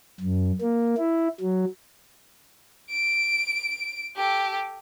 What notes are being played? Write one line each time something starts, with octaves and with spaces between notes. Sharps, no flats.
F#2
A#3
E4
F#3
D7
G4 A4